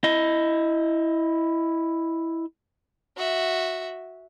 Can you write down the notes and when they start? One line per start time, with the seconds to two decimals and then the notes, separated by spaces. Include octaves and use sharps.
0.04 E4 D#5
3.17 F#4 E5